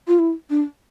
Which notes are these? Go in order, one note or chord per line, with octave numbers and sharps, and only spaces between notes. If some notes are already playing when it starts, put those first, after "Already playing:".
F4
E4
D4